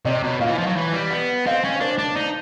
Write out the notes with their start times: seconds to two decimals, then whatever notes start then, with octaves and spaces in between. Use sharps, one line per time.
0.05 C3 C#5 D#5
0.23 B2
0.40 A#2 D#5 F5
0.49 E3
0.58 F3
0.66 F#3
0.76 E3
0.93 G3
1.10 B3
1.46 C4 D#5 F5
1.64 C#4
1.80 D4 C5 D5
1.98 D4
2.17 D#4